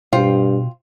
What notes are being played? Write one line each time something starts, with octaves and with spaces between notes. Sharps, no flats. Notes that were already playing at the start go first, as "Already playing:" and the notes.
G2 B2 F4 C5 G5